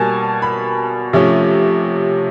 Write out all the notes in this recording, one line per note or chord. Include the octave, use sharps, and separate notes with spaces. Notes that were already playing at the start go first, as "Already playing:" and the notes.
Already playing: B2 G3 A#3 G#5 A5
B5
C3 F3 A3 C#4